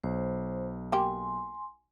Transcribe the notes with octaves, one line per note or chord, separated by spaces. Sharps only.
B1 C5
A#3 G4 G#5 C6